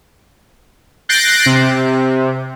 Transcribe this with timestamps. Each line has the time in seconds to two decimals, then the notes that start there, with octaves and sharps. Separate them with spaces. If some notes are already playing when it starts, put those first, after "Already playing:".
1.09 F#6 G6 A6 A#6 C7 D7
1.46 C3